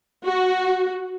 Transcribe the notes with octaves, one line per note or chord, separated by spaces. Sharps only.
F#4